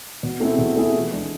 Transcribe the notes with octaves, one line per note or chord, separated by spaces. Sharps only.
B2
A3 C4 E4 G#4
B2
A3 C4 E4 G#4
E3
G#3 D4 G#4